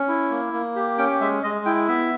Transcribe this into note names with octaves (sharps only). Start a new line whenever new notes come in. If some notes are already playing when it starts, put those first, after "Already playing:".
Already playing: C#4
E4
A#3
A#3
G4
C#4 G5
G#3 E5
G#3 D#5
E4 G5
B3 E5